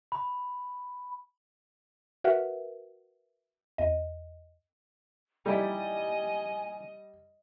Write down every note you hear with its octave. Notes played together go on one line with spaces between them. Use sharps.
B5
F#4 A#4 B4 E5 F#5
E2 D#5
G3 D#4 E4 G4 D#5 G#5